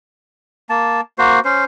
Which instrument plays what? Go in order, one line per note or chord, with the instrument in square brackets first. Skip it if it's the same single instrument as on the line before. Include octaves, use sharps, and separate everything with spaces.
[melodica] A#3 A5
A#3 F#4 C5
C#4 C5